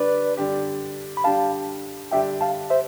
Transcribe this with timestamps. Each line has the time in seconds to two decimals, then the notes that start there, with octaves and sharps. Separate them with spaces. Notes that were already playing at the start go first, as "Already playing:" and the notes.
Already playing: D3 G3 D4 G4 B4 D5
0.37 D3 G3 D4 G4
1.17 B5
1.24 D3 G3 D4 G4 F5 A5
2.11 D3 G3 D4 G4 E5 G5
2.41 F5 A5
2.70 C5 E5